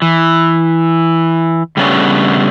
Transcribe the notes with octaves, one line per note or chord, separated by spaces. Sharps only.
E3
C#3 G3 A3 B3 C#4 D4